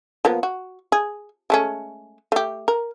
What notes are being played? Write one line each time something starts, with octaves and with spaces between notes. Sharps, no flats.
F3 A#3 B3
F#4
G#4
G#3 A3 C#4
A3 G4
A#4